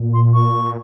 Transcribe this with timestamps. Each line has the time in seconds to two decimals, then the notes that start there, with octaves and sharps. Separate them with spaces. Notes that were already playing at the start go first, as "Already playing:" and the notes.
Already playing: A#2
0.14 C6
0.34 C#6